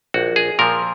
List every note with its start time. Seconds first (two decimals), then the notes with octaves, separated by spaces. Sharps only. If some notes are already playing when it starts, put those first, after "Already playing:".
0.14 A#1 F#4
0.36 G#4
0.59 A#2 F3 A#4